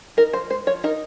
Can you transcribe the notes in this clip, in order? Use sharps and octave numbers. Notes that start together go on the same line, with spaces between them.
D#4 A#4
F3 C5
G#3 C5
F3 C#5
D#4 A#4